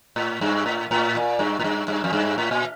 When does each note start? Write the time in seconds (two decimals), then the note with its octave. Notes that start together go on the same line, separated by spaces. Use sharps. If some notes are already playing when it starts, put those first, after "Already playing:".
0.16 A2
0.41 G2
0.66 A2
0.91 A2
1.15 A#2
1.39 G2
1.59 A2
1.64 G2
1.88 G2
2.04 F2
2.13 G2
2.38 A2
2.51 A#2